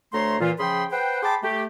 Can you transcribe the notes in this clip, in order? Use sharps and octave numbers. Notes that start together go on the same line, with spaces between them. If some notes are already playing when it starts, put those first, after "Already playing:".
D2 A3 C#5 A#5 C6
A#2 E3 F4
C#3 F3 G#4 G5 B5 C6
B4 C5 F#5 G5
G#4 G5 A5 B5 C6 D6
A3 G4